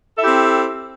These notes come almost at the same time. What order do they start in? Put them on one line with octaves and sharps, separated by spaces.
A4 E5 E4 G4 C4